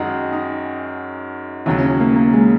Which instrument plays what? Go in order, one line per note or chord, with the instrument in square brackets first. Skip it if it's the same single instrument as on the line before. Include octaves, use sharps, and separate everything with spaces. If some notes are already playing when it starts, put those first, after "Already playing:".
Already playing: [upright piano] F#2 D#3 G#3 F#4 [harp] D#4
[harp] D#4
[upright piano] D#2 C#3 F#3 [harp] E4
[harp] C#4
A#3
A#3
G#3